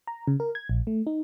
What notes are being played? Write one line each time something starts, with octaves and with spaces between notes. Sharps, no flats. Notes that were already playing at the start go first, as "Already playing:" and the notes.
A#5
C#3
A#4
G#6
A#1
A3
D#4